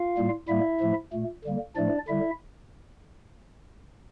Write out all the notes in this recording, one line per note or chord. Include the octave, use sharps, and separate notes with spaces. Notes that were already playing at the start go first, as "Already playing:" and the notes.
Already playing: F4 F5
A2 G3 A#3
A2 G3 A#3 E4 E5
A2 F3 A3
A#2 A3
D3 G3 A#3
A2 F3 A3 D4 D5
D3 G3 E4 E5